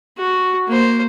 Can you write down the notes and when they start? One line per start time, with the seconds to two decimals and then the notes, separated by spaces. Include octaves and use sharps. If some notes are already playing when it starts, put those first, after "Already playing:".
0.17 F#4
0.67 A#3 C5